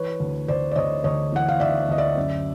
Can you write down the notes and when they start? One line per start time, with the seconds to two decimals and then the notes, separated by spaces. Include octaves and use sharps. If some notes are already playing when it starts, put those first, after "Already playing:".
Already playing: E3 B4 C#5
0.20 D2
0.48 D2 C5 D5
0.71 D5
0.76 D2 C#5 D#5
1.04 D2 C#5 D#5
1.32 E3 F#5
1.48 F5
1.60 D2 D5 E5
1.89 D2 D#5
1.98 D5 E5
2.17 F#2